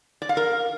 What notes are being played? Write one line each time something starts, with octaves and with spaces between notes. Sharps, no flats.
D5
F5
A#4